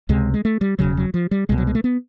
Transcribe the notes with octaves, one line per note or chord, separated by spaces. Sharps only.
C#2 C3 G#3
G#3
A3
G3
E1 D2 C#3 F#3
F#3
F3
G3
C2 B2 G#3
F#3
G#3
A3
B3